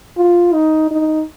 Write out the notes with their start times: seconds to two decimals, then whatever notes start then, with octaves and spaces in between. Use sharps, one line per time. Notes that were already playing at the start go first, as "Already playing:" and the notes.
0.17 F4
0.53 D#4
0.91 D#4